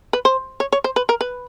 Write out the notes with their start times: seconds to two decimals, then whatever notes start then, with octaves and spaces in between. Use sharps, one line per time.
0.13 B4
0.25 C5
0.60 C#5
0.73 C#5
0.84 C5
0.96 B4
1.09 A#4
1.21 B4